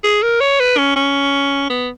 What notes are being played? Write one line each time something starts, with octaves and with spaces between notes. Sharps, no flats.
G#4
A#4
C#5
B4
C#4
C#4
B3